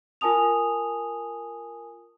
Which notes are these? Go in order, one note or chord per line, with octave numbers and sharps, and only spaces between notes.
F4 A#4 G#5 A5 D#6 F7